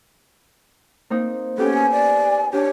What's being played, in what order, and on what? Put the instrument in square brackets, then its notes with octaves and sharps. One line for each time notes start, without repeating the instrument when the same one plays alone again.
[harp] A#3 C4 D#4
[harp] B3 G4 G5 [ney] C#4 [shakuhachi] A4
[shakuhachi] G#5
[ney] D5
[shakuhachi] D4 [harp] G4 [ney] C#5